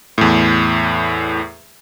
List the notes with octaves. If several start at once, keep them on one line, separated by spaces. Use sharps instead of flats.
E2 A2